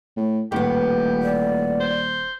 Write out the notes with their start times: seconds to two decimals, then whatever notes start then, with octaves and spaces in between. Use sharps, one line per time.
0.16 A2
0.52 D#1 A2 B3 G4
1.23 D5
1.80 C5